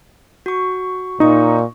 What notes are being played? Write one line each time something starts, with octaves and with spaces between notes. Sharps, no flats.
F#4 C#6
A#2 D#4 C#6 D#6